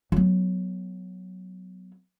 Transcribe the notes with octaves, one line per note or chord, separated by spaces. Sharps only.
F#3 B3